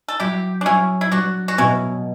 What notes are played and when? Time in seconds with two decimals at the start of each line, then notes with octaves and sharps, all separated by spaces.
0.08 A4
0.20 F#3 E4 G4
0.61 D4
0.66 F#3 C#4 E4
1.01 E4
1.12 F#3 D4 F#4
1.48 F#4
1.58 B2 C#4 E4